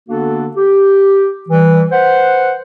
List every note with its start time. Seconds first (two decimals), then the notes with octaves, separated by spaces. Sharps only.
0.09 D3 A#3 B3 D4 F#4 A4
0.56 G4
1.49 E3 G3
1.91 B4 C5 F#5